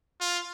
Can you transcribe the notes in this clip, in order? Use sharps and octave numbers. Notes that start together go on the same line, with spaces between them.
F4